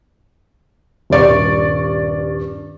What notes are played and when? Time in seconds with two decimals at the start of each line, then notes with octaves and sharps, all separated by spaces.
1.10 D#1 G2 D5 C#6